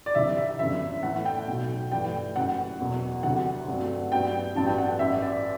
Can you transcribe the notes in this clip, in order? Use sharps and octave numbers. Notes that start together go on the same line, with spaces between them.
D5
D2 C3 E3 G3 E5
E5
G1 F#2 E3 E5
A2 E3 A3 F#5
G5
B1 B2 F#3
G2 E3 A3 G5
F#1 F#2 F#3 F#5
E1 E2 B2 F#3
D2 C3 F#3 F#5
G2 F#3 A3 C4
G2 F#3 B3 D4 G5
A1 G2 F#3 B3 A5
G5
F#5
F#5
A1 G2 E3 E5
D5